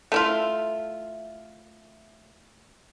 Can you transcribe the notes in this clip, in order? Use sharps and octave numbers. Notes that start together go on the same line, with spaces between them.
A3 E4 F4